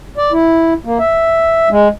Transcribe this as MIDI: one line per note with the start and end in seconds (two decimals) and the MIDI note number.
0.17 0.32 74
0.32 0.74 64
0.85 0.98 58
0.99 1.69 76
1.71 1.88 56